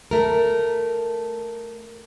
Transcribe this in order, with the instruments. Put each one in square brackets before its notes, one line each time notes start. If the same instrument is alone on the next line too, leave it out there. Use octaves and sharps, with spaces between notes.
[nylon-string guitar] A3 A#4